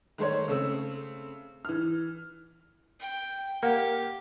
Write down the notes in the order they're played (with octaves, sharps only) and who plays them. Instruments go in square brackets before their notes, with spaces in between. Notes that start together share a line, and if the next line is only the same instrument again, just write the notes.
[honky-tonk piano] D#3 G#3 A3 C5 C#5
C#3 A3 C4 E6
E3 F6
[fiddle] G5
[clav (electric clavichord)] A#3 [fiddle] G4 [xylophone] F#5